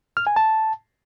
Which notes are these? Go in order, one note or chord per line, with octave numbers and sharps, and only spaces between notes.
F6
G#5
A5